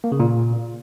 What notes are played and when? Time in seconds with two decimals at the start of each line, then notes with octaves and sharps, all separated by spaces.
0.04 A#3
0.12 C#3
0.20 A#2